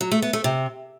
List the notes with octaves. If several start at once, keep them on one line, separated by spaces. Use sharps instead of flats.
F#3
A3
B3
A3
C3